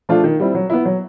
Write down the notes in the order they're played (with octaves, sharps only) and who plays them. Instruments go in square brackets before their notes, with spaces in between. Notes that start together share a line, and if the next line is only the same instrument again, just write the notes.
[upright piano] F3 A3 D4 F4
D#3
G3 C4 E4
F#3
B3 E4
F#3